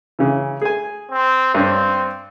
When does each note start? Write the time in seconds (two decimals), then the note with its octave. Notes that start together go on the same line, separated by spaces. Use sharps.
0.19 C#3 E3
0.62 G#4 G#5
1.11 C4
1.55 G2 C4 C#4